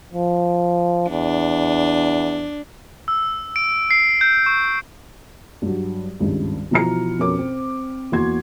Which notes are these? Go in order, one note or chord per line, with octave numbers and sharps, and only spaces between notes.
F3
E2 D4
E6
D7
C7
G6
C#6
G2 F#3
G#1 C#2 G2
B2 E3 F3 A#5 F6 C#7
F2 B2 C#4 A#4 D6
C4
E2 A#3 F#4 C6 G#6